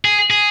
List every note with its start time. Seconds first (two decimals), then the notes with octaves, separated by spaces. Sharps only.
0.05 G#4
0.30 G#4